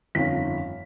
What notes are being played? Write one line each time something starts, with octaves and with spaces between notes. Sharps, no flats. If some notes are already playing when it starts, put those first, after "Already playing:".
G1 F2 D#3 C#4 F5 B6